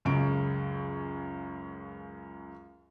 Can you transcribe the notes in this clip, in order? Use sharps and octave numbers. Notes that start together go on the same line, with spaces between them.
C#2 F#2 C#3 D7